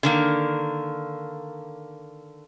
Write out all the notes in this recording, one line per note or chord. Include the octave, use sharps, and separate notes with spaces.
D3 D#3 A#3